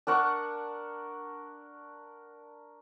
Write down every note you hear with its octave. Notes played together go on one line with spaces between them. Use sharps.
D4 A#4 F#5 C#6